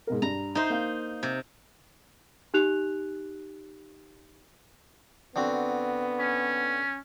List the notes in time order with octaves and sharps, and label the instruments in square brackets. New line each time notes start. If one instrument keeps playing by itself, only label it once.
[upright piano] G#2 B2 A#4
[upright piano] G2 [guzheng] A#5
[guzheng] D#4 C5 [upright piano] E5
[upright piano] A#3 F5
[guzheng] C3
[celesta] D#4 G4 F#6 F7
[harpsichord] D3 C4 F#4 [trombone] B3
[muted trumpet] C#4